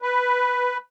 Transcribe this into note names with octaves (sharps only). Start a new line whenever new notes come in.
B4